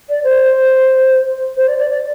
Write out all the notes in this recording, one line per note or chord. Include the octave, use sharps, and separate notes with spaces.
D5
C5
C5
D5
D5
D5